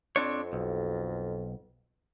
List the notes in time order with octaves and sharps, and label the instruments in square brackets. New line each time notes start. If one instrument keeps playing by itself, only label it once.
[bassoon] F2 [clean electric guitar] C4 D4 C#5
[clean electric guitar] B1